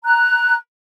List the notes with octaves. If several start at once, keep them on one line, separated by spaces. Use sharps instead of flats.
A#5 F#6